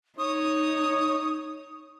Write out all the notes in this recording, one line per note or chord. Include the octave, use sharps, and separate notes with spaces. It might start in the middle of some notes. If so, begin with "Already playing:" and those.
D#4 C#5 D#6